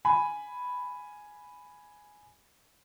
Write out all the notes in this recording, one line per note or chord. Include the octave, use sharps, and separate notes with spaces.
G#5 B5